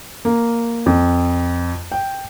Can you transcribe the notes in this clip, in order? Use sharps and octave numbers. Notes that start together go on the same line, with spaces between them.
A#3
F2
G5